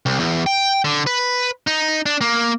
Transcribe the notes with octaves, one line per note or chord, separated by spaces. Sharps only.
C2
E2
G5
D3
B4
D#4
D4
A#3